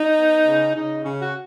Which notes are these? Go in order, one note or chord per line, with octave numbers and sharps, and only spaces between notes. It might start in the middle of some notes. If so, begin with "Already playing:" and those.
Already playing: D#4
B3
C#3
C#3 D#4
C#3 C#4
F#4